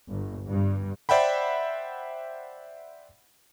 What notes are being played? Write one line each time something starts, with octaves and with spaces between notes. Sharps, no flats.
G1
G2
C5 D5 E5 F#5 G5 B5